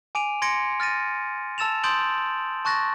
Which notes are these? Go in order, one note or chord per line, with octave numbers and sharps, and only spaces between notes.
G#5 D6 D7 D#7 F7
C6 G#6 A#6 C#7 D7
F6 A6 A#6 D#7
A5 E6 A6 E7 F7
C6 D#6 G6 A6 D7 F#7
A5 C#6 F#6 A6 A#6